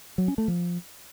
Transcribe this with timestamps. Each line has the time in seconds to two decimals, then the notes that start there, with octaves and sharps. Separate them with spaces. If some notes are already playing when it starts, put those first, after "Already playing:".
0.18 F#3
0.28 C#4
0.38 A3
0.48 F3